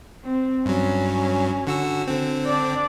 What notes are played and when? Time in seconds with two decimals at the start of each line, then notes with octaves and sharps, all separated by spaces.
0.24 C4
0.66 G2 F#3 C#4
1.67 D3 F#4 E6
2.08 D3 C4
2.46 D4 D5